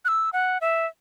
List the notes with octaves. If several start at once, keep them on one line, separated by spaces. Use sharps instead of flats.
F#6
E6
F#5
E5